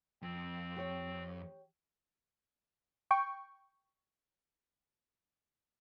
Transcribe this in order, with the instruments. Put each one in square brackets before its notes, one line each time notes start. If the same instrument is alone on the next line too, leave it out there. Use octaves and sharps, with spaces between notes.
[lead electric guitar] F2 [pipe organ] C4
[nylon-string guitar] G4 C#5 G5
[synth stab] G5 C#6